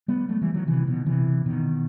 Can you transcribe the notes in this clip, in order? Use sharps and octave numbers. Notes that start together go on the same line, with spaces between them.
G3 B3
F#3 A3
E3 G3
D#3 F#3
C3 E3
B2 D#3
C3 E3
B2 D#3